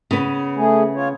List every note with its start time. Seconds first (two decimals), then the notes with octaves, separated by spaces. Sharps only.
0.11 C#3 B3
0.56 A3 G#4
0.95 F4 C#5